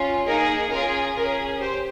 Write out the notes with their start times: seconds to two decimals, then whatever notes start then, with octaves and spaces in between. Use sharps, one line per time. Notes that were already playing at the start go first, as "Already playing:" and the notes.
Already playing: C#4 F4
0.26 A#3 D#4 G#4 A#4
0.71 C#4 F4 G#4 A#4
1.16 C#4 G#4 A#4
1.60 G4 C5